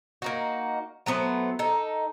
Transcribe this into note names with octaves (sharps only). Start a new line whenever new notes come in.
A#3 D#4 F#4
F#3 A3 B3 C5
D#4 A4